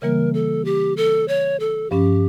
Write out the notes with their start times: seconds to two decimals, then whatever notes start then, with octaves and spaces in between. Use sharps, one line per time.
0.02 C#3 E3 G3 A#3 A#4
0.34 A4
0.65 G4
0.97 A4
1.28 C#5
1.60 A4
1.91 G2 F3 C#4 G4